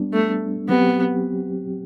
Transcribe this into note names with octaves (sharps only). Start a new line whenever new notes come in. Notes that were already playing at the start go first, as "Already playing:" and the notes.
Already playing: G3 B3 D4
A3
F#3 B3 C4 G4